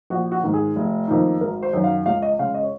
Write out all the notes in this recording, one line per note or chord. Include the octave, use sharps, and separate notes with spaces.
A#1 F#4
F#4
G#2 D#3
G#4
F1
F2 D#3 A#3 D#4
G#1 A#4
C5
F#2 D#3 F#3
F5
C#2 F5
D#5
C#3 G#3 F5
D#5
C#5